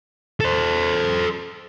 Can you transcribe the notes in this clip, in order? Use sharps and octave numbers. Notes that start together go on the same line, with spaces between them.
A4 C5